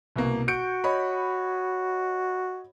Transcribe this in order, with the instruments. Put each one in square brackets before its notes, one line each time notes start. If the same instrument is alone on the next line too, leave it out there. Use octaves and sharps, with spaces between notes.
[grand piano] C2 B2 A#3
[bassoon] F#4 [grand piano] G6 C#7 D7
[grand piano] C#5 D#5 B5